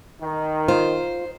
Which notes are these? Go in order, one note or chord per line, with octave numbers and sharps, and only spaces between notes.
D#3
F4 C5